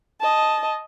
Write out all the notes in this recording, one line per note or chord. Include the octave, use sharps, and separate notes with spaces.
D#5 A5